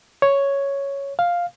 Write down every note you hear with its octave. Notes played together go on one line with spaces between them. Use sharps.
C#5
F5